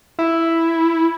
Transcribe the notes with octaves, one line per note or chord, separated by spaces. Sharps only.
E4